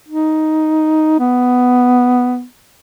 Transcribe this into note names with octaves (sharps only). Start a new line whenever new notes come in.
D#4
B3